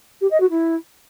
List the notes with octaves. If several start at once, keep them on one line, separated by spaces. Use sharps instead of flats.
G4
D#5
F#4
E4